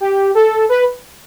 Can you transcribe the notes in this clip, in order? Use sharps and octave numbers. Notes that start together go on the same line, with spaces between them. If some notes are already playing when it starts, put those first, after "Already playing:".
G4
A4
B4